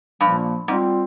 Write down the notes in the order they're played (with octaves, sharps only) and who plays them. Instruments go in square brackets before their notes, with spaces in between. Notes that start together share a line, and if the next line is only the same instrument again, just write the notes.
[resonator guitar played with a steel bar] G2 [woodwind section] A#2 F3 A#3
[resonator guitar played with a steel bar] G#2 [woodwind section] G3 C4 F4